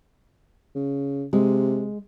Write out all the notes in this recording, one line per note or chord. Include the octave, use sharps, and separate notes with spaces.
C#3
C3 G#3